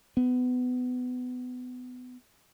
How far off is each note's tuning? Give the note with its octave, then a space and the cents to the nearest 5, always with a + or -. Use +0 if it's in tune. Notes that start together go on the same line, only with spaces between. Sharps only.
B3 +20